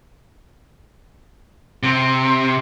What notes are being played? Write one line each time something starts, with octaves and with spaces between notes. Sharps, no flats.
C3